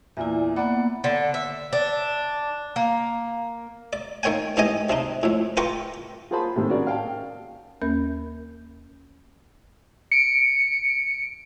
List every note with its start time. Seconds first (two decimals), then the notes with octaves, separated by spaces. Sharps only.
0.17 E2 A#2 E4 D5 E5
0.56 A#3 B3 D5 F#5 B5
1.04 D3
1.34 E5
1.73 D4
2.76 A#3
3.93 D5
4.23 D#3 A#3 C#5 G5 G#5
4.57 G#2 E3 C#4 G4 D#5 G#5
4.89 C3 D4 D#4
5.23 F2 A2
5.57 F4 A#4 B4 G5 C#6 D6
6.31 F4 G#4 A#4 C5 A5 B5
6.56 A2 C3 D#3 A3
6.69 C#4 F#4 G#4 A#4 D5
6.87 F5 G5 A5
7.82 D#2 A#3 C#4 A#4 G6
10.12 C#7 D7